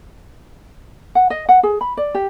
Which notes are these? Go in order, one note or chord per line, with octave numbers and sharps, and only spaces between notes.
F#5
D#5
F#5
G#4
B5
D5
G4